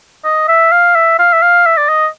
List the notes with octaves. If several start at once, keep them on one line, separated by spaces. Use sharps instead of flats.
D#5
E5
F5
E5
F5
E5
F5
E5
D5
D#5